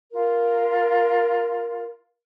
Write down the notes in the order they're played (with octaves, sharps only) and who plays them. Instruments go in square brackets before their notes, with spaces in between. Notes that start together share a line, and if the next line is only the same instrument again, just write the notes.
[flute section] F4 A#4